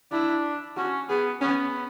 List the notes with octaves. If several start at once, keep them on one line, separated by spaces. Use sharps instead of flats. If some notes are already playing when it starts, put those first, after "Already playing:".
D4 E4
C#4 F#4
B3 G#4
B3 C#4